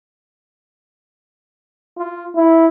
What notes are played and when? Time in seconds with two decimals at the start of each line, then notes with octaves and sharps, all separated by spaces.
1.98 F4
2.36 E4